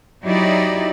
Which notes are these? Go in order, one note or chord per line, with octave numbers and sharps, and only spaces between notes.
F#3 D#4 E4 G4 D5